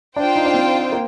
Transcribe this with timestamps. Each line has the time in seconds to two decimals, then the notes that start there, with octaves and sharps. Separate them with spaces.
0.16 D4 F4 C5 G5
0.36 D#4
0.45 D4
0.54 C4
0.92 A#3